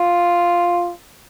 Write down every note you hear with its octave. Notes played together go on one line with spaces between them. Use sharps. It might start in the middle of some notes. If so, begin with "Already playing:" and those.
Already playing: F4